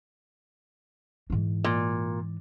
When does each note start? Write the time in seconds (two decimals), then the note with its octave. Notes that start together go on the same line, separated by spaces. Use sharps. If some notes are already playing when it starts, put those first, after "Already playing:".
1.30 G#2 E3
1.64 A#2